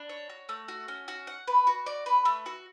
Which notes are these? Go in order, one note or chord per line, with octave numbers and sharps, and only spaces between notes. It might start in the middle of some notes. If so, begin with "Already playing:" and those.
Already playing: D4
C#5
F#4
A3
F#4
C#4
F#4
F#5
B4
F#4
D5
B4
A3
F#4